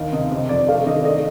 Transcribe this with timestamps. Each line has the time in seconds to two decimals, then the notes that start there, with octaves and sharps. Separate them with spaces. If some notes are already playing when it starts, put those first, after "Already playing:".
Already playing: D#2 D#3 F5
0.12 C3 D#5
0.31 C3
0.49 F2 D5
0.68 A3 F5
0.86 D#3 D#5
1.00 D5
1.05 A3 D#5